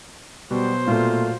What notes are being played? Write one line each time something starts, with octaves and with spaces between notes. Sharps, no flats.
B2 F#3 G3 C5
A#2 A3 F4